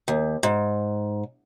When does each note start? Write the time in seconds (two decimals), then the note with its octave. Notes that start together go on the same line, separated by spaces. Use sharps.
0.08 D#2
0.43 G#2